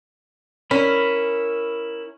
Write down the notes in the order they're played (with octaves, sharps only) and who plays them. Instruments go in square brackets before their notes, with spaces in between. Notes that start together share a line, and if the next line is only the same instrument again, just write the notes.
[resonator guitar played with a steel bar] C#4 [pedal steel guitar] E4 A#4 B5